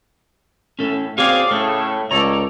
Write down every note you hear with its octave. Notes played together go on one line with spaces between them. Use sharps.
A2 C#4 A4
C4 F#4 G#4 C#5 D5 F5
A2 C#3 A3 A4
C#2 A4 C#5 D5 A#5